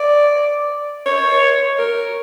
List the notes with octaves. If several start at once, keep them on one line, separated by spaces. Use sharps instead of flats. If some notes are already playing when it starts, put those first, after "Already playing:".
Already playing: D5
C#5
A#4